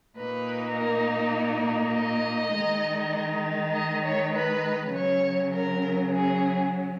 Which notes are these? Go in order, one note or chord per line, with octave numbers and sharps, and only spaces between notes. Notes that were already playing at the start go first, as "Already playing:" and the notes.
A#2 A#3 D#4 B4
A#4
D#5
D#3 G#3 D#4
D#5
C#5
B4
C#3 F#3 C#4 C#5
A#4
G#4